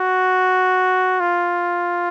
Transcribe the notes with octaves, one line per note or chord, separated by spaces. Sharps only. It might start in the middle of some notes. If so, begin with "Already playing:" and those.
Already playing: F#4
F4